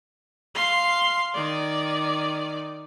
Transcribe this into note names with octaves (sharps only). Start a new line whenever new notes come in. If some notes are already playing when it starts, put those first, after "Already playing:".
F5 C6
D#3 D5